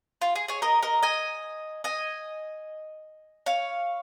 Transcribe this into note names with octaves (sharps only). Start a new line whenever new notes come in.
F4
G#4
G#4 C#5
A#4 D#5
A#4 D#5
D#5 G#5
D#5 G#5
C#5 F5